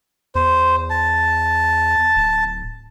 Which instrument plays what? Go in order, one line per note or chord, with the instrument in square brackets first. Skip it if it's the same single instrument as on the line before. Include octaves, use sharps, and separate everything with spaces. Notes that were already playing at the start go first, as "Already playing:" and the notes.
[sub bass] E2 [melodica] C5
[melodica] A5
[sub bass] D1